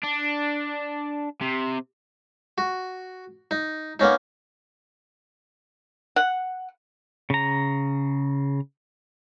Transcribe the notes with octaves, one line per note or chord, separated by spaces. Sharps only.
D4
C3
F#4
D#4
A#3 B3 C#4 D#4
F#5
C#3 A#5